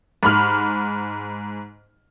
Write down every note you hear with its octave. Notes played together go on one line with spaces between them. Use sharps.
G#2 B5 F6